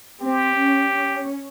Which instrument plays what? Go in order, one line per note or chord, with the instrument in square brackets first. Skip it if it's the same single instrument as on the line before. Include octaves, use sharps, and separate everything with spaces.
[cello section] C4 [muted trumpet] G4
[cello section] C#4
C#4